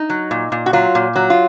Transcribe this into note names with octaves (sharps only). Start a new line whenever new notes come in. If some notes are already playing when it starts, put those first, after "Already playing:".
Already playing: D#4
F#3
A#2
A#2
F#4
F#3 F4
A#2
F#3
F4